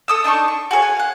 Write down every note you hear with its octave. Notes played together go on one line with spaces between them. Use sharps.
A4 D#6 E6
D4 D#4 A5 C#6
C#6
F#4 G#4 A4 C#5
F#5 G#5
F5 F#5